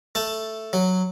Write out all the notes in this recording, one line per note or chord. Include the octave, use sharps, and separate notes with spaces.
A3 A5
F#3